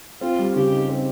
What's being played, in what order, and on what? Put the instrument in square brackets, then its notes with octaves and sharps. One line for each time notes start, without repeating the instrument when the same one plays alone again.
[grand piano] C4 [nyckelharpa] F4
[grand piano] G3
[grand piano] C#3 [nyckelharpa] G4
[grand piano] D#4
C4